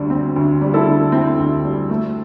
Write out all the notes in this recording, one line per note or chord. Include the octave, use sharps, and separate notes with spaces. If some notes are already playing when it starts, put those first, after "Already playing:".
Already playing: D2 D3 G3
C4
D2
G3
E4 A4
D3
C4 E4
D2
G3
A3